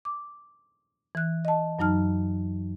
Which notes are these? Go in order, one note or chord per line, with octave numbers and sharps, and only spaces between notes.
D6
E3 F#6
D#5 A5
F#2 F#3 D#4 A5 F6